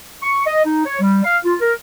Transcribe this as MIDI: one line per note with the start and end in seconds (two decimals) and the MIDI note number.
0.23 0.46 85
0.47 0.61 75
0.65 0.85 63
0.86 0.97 73
1.01 1.23 55
1.25 1.38 77
1.45 1.55 65
1.61 1.74 70